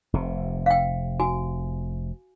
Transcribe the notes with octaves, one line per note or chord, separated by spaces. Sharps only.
F1 C3
F5 G5
F#4 G#5